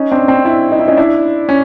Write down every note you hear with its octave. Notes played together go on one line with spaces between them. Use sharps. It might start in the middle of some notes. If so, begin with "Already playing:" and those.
Already playing: C#4 D#4
C4 D4
C4 D4
D4 E4
D#4
E4
C#4 D#4
D4 E4
C#4